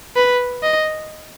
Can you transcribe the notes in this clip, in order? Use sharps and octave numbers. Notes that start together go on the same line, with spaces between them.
B4
D#5